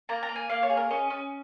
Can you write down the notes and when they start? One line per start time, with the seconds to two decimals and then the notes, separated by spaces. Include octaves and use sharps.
0.09 A#3 A#5
0.23 A#5
0.29 A#3
0.36 G#5
0.50 A#3 F5
0.63 C#5
0.70 G#4
0.77 A#4
0.90 C#4 D#5
1.10 C#4